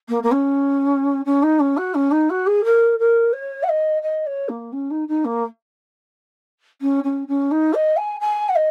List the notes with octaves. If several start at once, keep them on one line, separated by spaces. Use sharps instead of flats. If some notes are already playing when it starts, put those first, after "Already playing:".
A#3
A#3
C#4
C#4
D#4
C#4
F#4
C#4
D#4
F#4
G#4
A#4
A#4
C#5
F#5
D#5
D#5
C#5
A#3
C#4
D#4
D#4
A#3
C#4
C#4
C#4
D#4
D#5
G#5
G#5
F#5
D#5